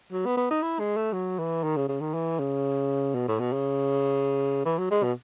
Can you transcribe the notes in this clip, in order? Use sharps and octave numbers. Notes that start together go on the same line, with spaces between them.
F#3
B3
B3
D#4
E4
G#3
A3
F#3
E3
D#3
C#3
C#3
D#3
E3
C#3
B2
A2
B2
C#3
E3
F#3
G#3
B2